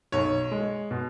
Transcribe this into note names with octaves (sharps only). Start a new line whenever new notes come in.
B1 C#5
G#3
B2